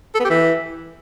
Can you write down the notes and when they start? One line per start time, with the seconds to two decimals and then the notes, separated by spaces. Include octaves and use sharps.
0.15 A4
0.20 B3
0.25 G4
0.30 E3